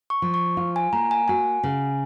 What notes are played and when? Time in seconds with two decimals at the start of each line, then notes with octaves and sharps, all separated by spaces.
0.10 C#6
0.22 F3
0.34 C#6
0.57 F4
0.76 G#5
0.93 A#3 A#5
1.11 G#5
1.28 F#4 G#5
1.63 C#3